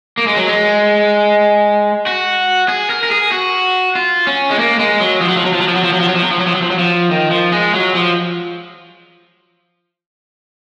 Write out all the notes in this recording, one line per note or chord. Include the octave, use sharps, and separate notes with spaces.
A#3
G#3
F#3
G#3
F#4
G#4
A#4
A#4
G#4
F#4
F4
C#4
G#3
A#3
G#3
F#3
F3
F#3
F3
F#3
F3
F#3
F3
F#3
F3
F#3
F3
F#3
F3
F#3
F3
F#3
F3
F#3
F3
F#3
F3
D#3
F3
G#3
F#3
F3